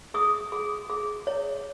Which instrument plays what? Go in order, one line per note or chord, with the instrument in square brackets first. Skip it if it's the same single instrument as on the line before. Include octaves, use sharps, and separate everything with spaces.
[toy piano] G#4 D#6
G#4
G#4
C#5